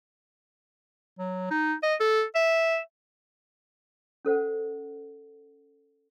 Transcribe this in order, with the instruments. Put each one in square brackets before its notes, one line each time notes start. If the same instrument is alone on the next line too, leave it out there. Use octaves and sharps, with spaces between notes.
[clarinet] F#3
D#4
D#5
A4
E5
[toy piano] C#4 A4 C5 F#5